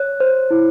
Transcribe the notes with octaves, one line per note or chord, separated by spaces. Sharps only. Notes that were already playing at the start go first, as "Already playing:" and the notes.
Already playing: C#5 F#6
C5
E4